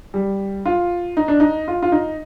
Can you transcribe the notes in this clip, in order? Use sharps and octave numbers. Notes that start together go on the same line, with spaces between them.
G3
F4
D#4
D4
D#4
F4
F4
D#4